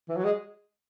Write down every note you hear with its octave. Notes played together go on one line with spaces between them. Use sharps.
E3
F#3
G#3